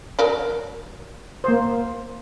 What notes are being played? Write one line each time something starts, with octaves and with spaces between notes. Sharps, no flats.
F#3 A#4 D5
A#3 C5